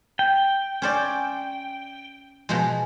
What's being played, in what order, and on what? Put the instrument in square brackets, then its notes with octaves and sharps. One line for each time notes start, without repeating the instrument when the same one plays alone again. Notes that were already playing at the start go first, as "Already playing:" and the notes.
[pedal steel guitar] G5
[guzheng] C#4 C5 D5
B2 F3 G#3